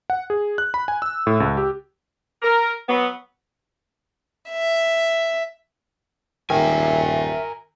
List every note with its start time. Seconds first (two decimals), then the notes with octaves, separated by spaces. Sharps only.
0.10 F#5
0.30 G#4
0.58 F#6
0.74 B5
0.88 G#5
1.02 E6
1.27 A2
1.40 C#2
1.57 G4
2.42 A#4
2.89 F#3 B3
4.51 E5
6.50 D#1 D#3 A#4 E5 G#5